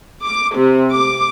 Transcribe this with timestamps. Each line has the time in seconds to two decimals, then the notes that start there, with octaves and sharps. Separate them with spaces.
0.23 D6
0.55 C3
0.91 D6